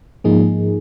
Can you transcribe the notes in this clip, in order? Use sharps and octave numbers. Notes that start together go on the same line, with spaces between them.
G#2 F3 A#3 D#4 G#4